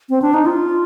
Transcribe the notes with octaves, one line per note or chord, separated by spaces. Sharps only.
C4
D4
D#4
F4